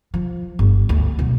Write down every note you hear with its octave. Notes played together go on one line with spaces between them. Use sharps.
F3
G1
D2
B1